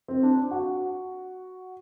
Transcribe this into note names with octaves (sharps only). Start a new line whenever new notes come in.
C4
D4
F#4